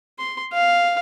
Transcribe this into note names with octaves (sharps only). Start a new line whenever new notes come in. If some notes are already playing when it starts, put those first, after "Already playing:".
C6
F5